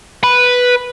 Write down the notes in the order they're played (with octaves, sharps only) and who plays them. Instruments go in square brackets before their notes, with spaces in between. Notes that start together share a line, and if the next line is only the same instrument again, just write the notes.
[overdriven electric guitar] B4